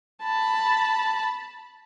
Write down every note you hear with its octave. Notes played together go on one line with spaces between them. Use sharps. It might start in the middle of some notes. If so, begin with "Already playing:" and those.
A5 B5